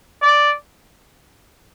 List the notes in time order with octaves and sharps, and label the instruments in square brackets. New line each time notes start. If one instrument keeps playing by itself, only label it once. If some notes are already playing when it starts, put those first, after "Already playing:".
[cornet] D5